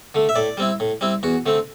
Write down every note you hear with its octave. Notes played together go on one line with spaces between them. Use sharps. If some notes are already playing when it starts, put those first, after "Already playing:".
D3 A3
E5
A2 D5
G3 C4 E4
A2
G3 C4 E4
E2 F#4
D3 A3 C4